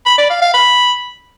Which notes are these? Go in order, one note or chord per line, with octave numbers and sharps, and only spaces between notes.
B5
D5
F5
F5
B5